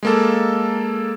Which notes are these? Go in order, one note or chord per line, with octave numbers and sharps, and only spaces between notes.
G#3 A#3 A4